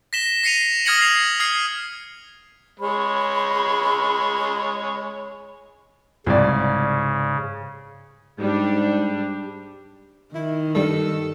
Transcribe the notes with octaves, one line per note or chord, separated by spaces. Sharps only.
A#6 B6 E7 G7
A#6 C7 C#7 D#7 F7
D#6 F6 G#6 A#6 C#7 F#7
C7 F7
D#6 F6 G#6 C7
G#3 C#5 B5
C2 G#2 C#3 G3 D5
G#2 G3 D4
D#3 E4
G2 G3 A4